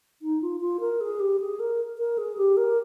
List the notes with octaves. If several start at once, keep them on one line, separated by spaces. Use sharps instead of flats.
D#4
F4
F4
A#4
G#4
G4
G#4
A#4
A#4
G#4
G4
A#4